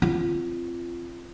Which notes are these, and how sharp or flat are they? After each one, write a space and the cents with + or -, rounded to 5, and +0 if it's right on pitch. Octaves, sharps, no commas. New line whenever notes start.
C4 +0 F4 -25